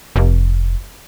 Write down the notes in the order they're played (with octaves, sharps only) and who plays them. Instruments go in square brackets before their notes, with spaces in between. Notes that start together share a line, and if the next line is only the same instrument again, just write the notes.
[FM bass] F1